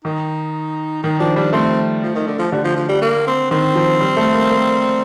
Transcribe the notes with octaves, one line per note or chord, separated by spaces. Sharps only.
D#3 D#4
D#3 D#4
F3 D4
G3 D4
A3 C4
F3
D#3
D3
F3
D3 G3
F3
F3
G3
A#3
C4
D#3 C4
F3
G3
A3
A#3
A#3